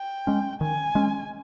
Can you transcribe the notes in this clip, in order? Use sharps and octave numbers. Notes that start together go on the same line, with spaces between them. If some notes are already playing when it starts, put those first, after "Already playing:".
Already playing: G5
G#3 C#4
D#3 G#5
G#3 C#4